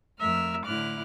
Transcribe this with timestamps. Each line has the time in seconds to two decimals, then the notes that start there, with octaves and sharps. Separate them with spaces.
0.20 F2 A3 A#4 E5 F6
0.65 A2 D3 E4 D6 F6 F#6